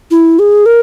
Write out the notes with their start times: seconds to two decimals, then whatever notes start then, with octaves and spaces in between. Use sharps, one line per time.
0.11 E4
0.39 G#4
0.66 A#4